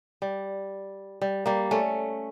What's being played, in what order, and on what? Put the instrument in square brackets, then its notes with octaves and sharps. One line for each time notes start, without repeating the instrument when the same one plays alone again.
[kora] G3
G3
G3 A#3
A3 C#4